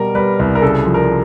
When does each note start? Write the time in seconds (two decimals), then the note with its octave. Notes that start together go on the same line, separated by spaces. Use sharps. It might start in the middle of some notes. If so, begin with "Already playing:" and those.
Already playing: B2 G3 A#4
0.15 G3 B4
0.39 C2
0.55 A#4
0.62 C#3 A4
0.85 F3
0.94 A#4